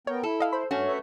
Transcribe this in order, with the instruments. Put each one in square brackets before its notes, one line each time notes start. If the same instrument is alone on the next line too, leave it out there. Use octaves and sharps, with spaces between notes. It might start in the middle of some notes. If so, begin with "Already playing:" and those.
[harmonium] B3 A#4 G5 [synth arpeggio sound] C#5
[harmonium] E4 [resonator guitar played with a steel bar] A4
[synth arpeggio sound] D#5 F5
[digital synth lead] C5 [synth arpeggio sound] B5
[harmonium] G2 [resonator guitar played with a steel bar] A3 F#4 [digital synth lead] C#4
[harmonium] B4 C#5 E5